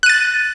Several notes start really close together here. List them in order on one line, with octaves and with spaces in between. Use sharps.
F#6 D#7 A6